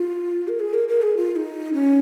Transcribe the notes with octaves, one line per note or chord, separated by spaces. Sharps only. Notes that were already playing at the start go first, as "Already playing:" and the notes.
Already playing: F4
A#4
G#4
A#4
A#4
G#4
F4
F4
D#4
C#4